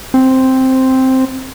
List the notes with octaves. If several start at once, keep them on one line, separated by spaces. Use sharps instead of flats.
C4